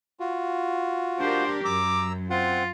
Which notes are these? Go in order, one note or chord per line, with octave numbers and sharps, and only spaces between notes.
F4 F#4
D4 G4 A#4 C5
F#2 A#5 D6 E6
C4 F4 F#5